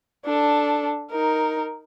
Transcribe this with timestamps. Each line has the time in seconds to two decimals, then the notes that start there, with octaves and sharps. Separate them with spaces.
0.25 D4 A4
1.11 D#4 A#4